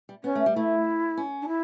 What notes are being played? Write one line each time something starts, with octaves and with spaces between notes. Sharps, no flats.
G3
B3 C#4
A3
G3
A3 E4
C#4
D4
E4